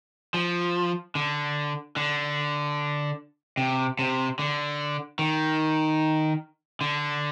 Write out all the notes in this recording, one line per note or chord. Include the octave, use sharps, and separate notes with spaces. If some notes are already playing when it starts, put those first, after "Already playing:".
F3
D3
D3
C3
C3
D3
D#3
D3